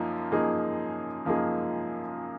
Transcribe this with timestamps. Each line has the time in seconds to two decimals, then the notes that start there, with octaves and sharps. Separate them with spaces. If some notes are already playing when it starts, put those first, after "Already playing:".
Already playing: F#2 F3 A#3 D#4
0.32 F#2 F3 A#3 D#4 G#4
1.25 F#2 F3 A#3 D#4 G#4